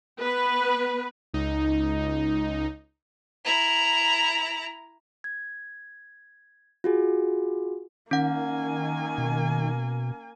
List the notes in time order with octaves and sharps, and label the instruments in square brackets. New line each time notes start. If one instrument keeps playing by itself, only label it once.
[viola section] B3 B4
[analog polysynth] C#2 D#4
[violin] E4 A#5
[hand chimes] G#6
F4 F#4 G#4
[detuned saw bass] D#3 [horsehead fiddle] A#3 G#5 [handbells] C#4 F#5
[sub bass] B2